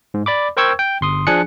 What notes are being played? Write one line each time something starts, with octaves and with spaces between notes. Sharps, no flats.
G#2
D5 B5 D6
A#4 C5 G5 C#6 E6 G#6
G5
G1 C6 D#6
F3 D4 G#4 G#5 F#6 C#7